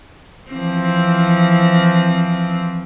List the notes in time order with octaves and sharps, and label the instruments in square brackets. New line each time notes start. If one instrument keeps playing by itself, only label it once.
[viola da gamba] E3 F3 C4